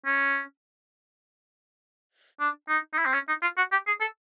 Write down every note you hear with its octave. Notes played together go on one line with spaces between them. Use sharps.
C#4
D4
D#4
D#4
E4
C4
C#4
D#4
F4
F#4
G4
G#4
A4